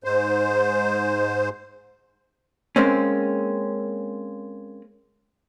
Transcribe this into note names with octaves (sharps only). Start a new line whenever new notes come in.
G#2 C5
G#3 A#3 C4 C#4